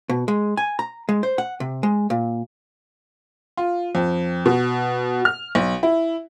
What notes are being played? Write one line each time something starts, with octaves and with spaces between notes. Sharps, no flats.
B2
G#3
G#5
A#5
G#3
C5
F#5
C3
G#3
A#2
F4
F2
B2
F6
B1
E4